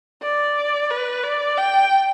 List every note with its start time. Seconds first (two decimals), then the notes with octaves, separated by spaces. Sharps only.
0.22 D5
0.90 B4
1.23 D5
1.58 G5